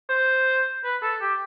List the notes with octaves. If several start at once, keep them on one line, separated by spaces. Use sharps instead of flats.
C5
B4
A4
G4